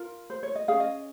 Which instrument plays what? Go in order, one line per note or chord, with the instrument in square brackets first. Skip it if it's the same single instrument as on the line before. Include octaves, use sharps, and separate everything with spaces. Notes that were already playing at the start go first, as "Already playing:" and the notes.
Already playing: [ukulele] F4 A#4
C5
C#5
D#5
C#4 G#4 F5
D#5